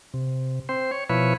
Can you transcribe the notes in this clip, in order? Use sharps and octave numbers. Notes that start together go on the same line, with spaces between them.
C3
C4 C5
C#5
B2 F3 E4 B4 C#5